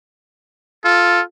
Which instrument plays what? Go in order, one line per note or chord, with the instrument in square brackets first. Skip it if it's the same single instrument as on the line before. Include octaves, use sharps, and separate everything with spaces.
[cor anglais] F4 [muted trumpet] A4